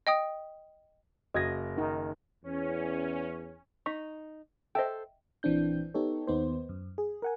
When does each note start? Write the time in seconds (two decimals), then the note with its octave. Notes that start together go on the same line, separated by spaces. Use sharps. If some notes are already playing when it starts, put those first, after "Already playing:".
0.07 D#5 G5 D#6
1.34 F#1 F#4 D#5 G#6 A#6
1.78 D#3 D#4
2.44 E2 C#4
3.86 D#4 C#6 B6
4.75 A4 C5 D#5 E5 G5
5.43 A#1 E3 C4 D4 G6
5.94 B3 D#4 G4 A4 C#5
6.27 D#2 B3 D#4 C5
6.69 F#2
6.98 G#4
7.22 A#4 F#5 G#5